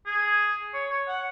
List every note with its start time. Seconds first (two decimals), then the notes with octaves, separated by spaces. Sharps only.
0.06 G#4
0.74 C#5
0.90 C#5
1.08 F#5